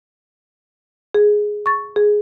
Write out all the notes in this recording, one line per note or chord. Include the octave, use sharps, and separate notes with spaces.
G#4
C#6 A6
G#4